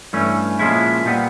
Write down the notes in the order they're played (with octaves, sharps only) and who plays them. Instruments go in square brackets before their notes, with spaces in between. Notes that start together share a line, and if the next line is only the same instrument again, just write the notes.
[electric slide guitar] G2 E3 A3 C#4
A#2 F3 G#3 C#4 E4
A#2 G3 B3